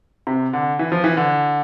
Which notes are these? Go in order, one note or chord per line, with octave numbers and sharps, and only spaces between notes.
C3
D3
E3
F3
E3
D3